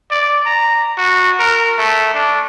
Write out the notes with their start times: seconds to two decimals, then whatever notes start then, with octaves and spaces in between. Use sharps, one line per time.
0.11 D5
0.46 A#5
0.97 F#4
1.39 A#4
1.78 A3
2.14 D4